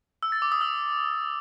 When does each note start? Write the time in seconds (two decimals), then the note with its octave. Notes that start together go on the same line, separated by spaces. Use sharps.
0.23 E6
0.32 A6
0.42 D6
0.52 D#6
0.61 E6